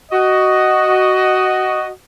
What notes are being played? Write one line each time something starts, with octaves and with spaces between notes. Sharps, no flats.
F#4 D#5